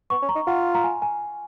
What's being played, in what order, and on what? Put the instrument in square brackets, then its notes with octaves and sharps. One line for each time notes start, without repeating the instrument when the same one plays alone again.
[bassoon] B3 [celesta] C#6
[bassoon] C#4
[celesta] A#5
[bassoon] D#4
[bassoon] F4 [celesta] F#5
[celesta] A#5
G#5
G#5